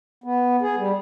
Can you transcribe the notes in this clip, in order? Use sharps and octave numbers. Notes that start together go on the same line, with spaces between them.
B3
G#4
G3